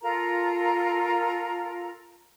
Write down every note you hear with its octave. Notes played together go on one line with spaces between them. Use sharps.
F4 A4 A#4 A#5